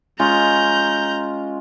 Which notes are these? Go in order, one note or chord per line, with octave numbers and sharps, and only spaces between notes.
G#3 C#4 F4 A#5 G6